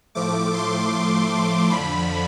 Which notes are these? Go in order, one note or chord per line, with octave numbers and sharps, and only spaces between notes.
A2 F3 A3 D6
C6
D6
C6
F2 D3 F3 B5